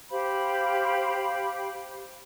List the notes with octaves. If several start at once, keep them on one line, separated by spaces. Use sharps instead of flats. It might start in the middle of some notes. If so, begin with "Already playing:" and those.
G4 C5 F5 B5